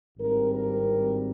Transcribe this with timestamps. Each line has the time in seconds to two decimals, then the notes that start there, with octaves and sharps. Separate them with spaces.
0.17 G#1 G2 G3 C4 A#4
0.54 A#4